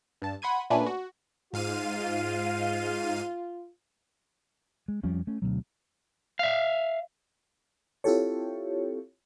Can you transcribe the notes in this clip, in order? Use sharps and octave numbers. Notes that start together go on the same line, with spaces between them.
G2 A5
F#5 B5 C6 G#6 D#7
A#2 A3 C#4 D4 B4 G#5
F#4
G#2 F4 F5 D#7
G#3
F2 F3 G3 C#4
A3 C#4
D2 B2 F#3
E5 F5
C4 E4 F4 G4 A4 C#5